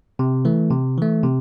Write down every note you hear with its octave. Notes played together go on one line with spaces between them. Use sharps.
C3
E3 A3
C3
E3 A3
C3